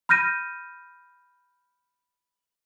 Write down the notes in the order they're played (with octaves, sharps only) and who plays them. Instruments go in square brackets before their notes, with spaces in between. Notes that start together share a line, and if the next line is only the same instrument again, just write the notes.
[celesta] B5 F6 G6 A#6 D#7